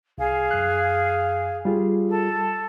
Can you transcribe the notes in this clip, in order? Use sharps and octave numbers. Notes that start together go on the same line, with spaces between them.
C2 G#4 F5 G#5
F#2 F#6
G3 F4 G#4
A4